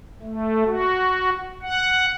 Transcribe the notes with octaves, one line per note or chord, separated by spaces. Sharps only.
A3
F#4
F#5